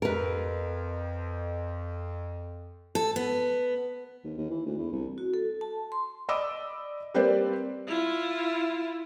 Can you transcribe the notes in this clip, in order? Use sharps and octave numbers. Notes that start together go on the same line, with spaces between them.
F2 A#4 B4
A4
B3
D#2
D#2
E3
D2
E2
C2
F#4
A4
A5
C6
D5 D#5 B5 D6 E6
G3 A#3 C4 B4 C5 D5
E4 F4